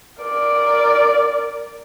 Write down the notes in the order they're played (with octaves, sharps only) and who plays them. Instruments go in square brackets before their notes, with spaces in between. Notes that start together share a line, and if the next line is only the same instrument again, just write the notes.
[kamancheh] A#4 D5